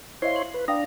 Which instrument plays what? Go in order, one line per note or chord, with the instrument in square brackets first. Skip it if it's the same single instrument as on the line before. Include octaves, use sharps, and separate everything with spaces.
[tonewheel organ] E4 C#5 C6 [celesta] C5 D#5 F5
[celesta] F#7
[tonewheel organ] B4
[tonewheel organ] D4 A#5 [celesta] F5 G5 D#6